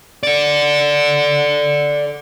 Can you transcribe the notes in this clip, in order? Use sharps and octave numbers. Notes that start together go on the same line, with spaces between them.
A4 D5